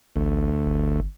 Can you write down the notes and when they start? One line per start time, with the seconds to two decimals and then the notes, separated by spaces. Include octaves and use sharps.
0.16 A1 D2
0.66 G1